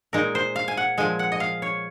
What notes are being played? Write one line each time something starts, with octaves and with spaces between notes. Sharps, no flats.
A#2 G#3 D#4 A#4
C5
F5
G#5
F#5
A#2 F3 G#3 G#5
F#5
D#5
F5
C#5